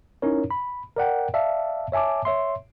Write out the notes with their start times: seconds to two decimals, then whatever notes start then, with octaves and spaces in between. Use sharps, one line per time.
0.22 C#4 D#4 E4 A#4 C#5
0.51 B5
0.97 A#4 D5 F#5 G5
1.34 D5 E5 F5 A5
1.92 C#5 E5 G#5 A5 D6
2.25 C#5 E5 C6